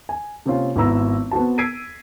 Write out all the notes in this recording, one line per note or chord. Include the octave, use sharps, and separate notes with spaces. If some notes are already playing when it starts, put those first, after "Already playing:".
G#5
C3 A#3 C4 C#4 F4
G#1 B3 E4 A#5 E6
B3 C4 F#4 A5
E6 G#6 B6 C7 D7 D#7